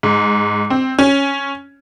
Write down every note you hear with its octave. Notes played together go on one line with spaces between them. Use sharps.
G#2
C4
C#4